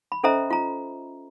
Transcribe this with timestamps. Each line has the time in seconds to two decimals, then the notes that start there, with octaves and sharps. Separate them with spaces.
0.12 B5
0.24 C#4 A4 C5 D#5 E5 A#5
0.51 F4 A#5